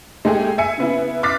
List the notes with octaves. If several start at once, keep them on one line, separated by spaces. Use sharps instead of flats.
G#3 A3 G4 G#4
E5 G#5 C#7
C#3 B3 E4
D6 F6 F#6 A6 B6 C7